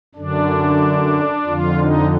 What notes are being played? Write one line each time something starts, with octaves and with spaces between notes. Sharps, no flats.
F#2 D3 D4
F2 D3 F4
D#4